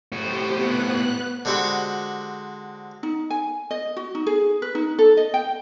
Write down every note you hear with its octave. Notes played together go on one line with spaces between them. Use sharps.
A2 F#4 G4 C5
B3 F#6
D3 G#3 C4 F#4 G4 B5
D#4
G#5
D#5
F#4
D#4
G#4
B4
D#4
A4
D#5
G5